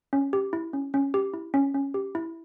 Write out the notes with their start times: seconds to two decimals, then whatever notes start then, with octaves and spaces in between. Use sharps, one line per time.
0.13 C#4
0.33 G4
0.53 E4
0.73 C#4
0.94 C#4
1.14 G4
1.34 E4
1.54 C#4
1.74 C#4
1.94 G4
2.15 E4